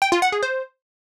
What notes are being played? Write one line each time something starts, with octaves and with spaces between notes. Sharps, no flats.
G5
F4
F#5
G#4
C5